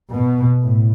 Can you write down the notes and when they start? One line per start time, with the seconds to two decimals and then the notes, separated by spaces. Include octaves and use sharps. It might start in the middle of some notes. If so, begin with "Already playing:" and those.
0.13 B2
0.63 A2